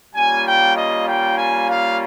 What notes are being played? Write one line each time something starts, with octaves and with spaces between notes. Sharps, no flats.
G3 A#3 C#4 F4 G#5
G5
D#5
G5
G#5
F5